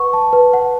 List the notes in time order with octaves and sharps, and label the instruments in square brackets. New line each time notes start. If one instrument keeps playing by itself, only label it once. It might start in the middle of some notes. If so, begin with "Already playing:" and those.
Already playing: [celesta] B4 F#5 C#6
A5
B4
F#5